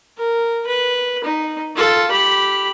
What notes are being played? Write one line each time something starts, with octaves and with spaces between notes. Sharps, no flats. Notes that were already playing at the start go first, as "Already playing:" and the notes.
A#4
B4
D#4
F4 A4
G4 B5